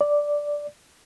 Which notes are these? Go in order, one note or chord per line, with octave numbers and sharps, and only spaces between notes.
D5